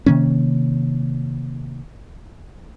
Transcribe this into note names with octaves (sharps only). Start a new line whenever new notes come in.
C3 D#3 A#3 C#4